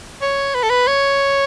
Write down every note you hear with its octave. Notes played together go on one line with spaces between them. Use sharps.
C#5
B4
A4
B4
C#5